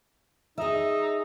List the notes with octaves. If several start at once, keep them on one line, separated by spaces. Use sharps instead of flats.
D#4 G#4 E5